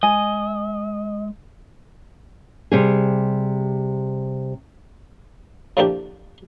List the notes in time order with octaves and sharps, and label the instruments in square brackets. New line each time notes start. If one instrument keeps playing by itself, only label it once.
[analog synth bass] G#3 [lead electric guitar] D#5 [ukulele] G#5
[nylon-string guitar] C3 G3 G#4
[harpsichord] A2 F3 A#3 D4 G4